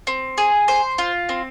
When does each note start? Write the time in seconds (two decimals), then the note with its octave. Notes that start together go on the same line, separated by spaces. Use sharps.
0.07 C4
0.38 G#4
0.68 C5
0.98 F4
1.29 C4